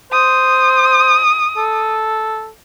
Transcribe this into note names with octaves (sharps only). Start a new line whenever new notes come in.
C5 D#6
A4